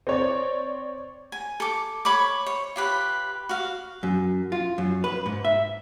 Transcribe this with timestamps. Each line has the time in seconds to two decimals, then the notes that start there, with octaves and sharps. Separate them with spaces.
0.07 C4 C#5 D5
1.32 G#5
1.60 A4 D6
2.05 C#5 B5 C#6 D6
2.46 C#5
2.76 F4 G4 B4
3.49 F#4 F5
4.03 F#2
4.52 F4
4.78 F#2
5.04 B4
5.26 G#2
5.45 E5